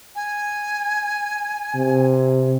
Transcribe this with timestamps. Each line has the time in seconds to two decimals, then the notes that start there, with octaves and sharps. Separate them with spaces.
0.16 G#5
1.75 C3